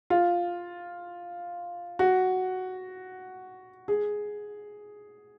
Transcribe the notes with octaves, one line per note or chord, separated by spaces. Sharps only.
F4
F#4
G#4